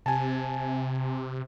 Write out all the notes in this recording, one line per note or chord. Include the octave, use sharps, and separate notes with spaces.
C3 G#5 A5